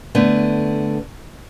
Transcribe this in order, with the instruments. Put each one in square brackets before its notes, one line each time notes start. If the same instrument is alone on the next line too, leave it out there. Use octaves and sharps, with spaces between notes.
[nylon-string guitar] D3 A3 B3